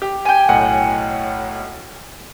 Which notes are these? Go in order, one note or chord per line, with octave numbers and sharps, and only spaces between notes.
G4
G5 G#5
B1 A2 F#5